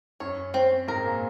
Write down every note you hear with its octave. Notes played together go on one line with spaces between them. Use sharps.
F#2 C#5
C4
G#2 A#4
A#2